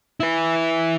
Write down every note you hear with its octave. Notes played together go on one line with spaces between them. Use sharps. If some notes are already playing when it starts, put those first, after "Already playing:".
E4 B4